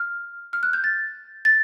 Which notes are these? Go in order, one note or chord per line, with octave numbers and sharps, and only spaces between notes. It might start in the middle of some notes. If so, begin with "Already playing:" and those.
Already playing: F6
F6
F#6
G6
A6
A6